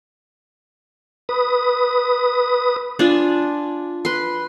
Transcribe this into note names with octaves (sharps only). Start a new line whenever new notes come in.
B4 D#6
D4 F4 G#5
B4 C6